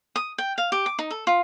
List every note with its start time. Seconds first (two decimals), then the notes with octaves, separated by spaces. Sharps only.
0.16 D#6
0.38 G5
0.58 F5
0.72 G4
0.86 D6
0.99 D#4
1.11 A4
1.27 F4